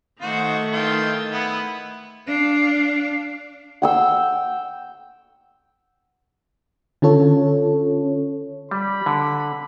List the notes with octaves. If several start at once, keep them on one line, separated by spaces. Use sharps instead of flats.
D#3 A3 A#3 D#4 F#4 C5
E3 F4 G5
B3 E4 B4
D4 F5
F#5 G5 E6
D3 C#4 F4 A4 C#5
G3 B5
D3